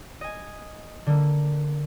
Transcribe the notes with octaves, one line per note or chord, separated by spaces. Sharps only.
D#5 G#5
D3 A#3